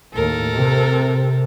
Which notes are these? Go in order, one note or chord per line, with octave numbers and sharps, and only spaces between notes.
D#2 A2 A4 A#4
C3